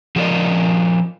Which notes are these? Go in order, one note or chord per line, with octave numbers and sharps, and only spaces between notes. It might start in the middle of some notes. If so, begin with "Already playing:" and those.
F3 F#3 G4 A#4 D5 D#5